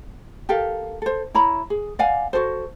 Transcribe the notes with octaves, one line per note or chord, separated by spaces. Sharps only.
G4 A4 A#4 F5
A4 C5
E4 C#5 A#5 B5
G#4
D5 F5 F#5 G#5
F#4 G#4 A4 C5